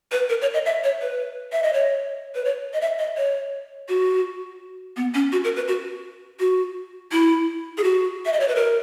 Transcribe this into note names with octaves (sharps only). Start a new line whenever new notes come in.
B4
A#4
C#5
D#5
E5
C#5
B4
E5
D#5
C#5
B4
C#5
D#5
E5
D#5
C#5
F#4
B3
C#4
F#4
A#4
B4
F#4
F#4
E4
G#4
F#4
E5
D#5
C#5
B4
A#4